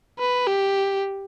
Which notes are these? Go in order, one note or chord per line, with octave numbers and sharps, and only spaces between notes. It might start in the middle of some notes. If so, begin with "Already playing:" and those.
B4
G4